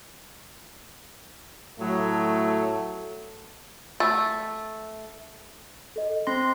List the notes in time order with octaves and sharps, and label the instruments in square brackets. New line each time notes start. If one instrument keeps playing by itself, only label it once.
[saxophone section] A2 F#3 [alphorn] A3
[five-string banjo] A3
[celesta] A4 D#5
[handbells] C4 C6 [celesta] A#6